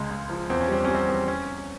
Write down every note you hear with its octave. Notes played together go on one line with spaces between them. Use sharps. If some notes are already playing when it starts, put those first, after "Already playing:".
Already playing: C#2 C#3 G#3
G#3
F3
E2 C4
C#4
G3 C4
G3 C#4
C4
E2
C#4